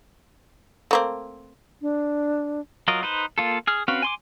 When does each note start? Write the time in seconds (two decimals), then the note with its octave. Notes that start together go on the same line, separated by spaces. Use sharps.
0.91 A3 A#3 C4
1.82 D4
2.88 F#3 F4 A#4 D#5
3.03 D#4 B4 C5
3.38 A#3 F4 A4
3.67 G#4 F6
3.88 C4 C#4 F#4 B4 F5
4.02 G#5 C6 D6